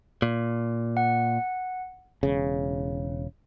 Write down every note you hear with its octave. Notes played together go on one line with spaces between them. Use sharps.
A#2
F#5
E1 C#3